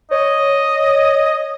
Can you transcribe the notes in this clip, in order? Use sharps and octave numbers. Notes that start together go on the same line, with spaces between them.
C#5 D#5